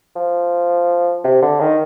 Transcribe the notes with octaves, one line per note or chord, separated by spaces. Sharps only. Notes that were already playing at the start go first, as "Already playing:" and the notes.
F3
C3
D3
D#3